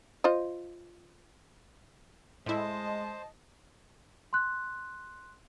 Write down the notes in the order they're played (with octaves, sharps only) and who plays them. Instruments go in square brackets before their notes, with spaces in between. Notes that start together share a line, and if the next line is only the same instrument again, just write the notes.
[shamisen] F4 C5 D#5
[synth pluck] A2 E4 [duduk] G#3 [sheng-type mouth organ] C5 [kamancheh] D#5 A5
[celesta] C6 F#6